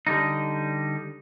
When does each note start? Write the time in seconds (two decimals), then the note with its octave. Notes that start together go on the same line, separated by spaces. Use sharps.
0.07 D3 G3 D#4